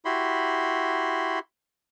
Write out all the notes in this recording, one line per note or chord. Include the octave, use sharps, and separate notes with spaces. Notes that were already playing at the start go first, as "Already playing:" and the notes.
E4 F#4 G4 B5 C6